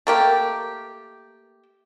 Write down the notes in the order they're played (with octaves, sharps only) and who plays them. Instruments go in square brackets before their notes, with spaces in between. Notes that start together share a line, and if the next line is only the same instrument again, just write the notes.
[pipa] A3 A#3 G4